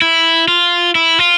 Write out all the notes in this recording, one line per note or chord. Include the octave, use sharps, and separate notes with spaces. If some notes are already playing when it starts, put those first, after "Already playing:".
E4
F4
E4
F4